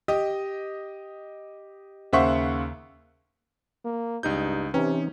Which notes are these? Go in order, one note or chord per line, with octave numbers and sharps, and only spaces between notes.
G4 D#5
D#2 C#3 C5 E5 F#5 C#6
A#3
C#2 G2 D#4 G6
C3 E3 C4 C#4 D#4